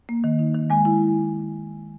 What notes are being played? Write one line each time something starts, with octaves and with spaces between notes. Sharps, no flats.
A#3
D#3
D#4
D#3
G#3 G#5
E4